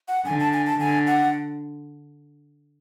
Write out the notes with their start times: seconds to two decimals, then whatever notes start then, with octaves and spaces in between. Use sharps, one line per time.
0.08 F#5
0.25 D3 G#5
0.40 A5
0.53 G#5
0.66 A5
0.80 D3 G#5
1.07 F#5